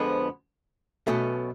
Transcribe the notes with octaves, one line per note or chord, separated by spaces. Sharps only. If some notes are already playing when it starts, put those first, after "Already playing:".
Already playing: F2 D3 F3 G#3 B3
B1 B2 F#3 A3 C#4